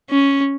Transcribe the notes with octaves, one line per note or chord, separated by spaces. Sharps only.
C#4